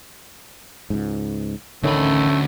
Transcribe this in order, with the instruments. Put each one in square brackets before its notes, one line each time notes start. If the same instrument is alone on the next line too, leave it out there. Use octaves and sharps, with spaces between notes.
[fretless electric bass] C#2 G#2
[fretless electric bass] A1 D3 D#3 [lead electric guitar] D2 B5 [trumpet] A3 [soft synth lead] C#4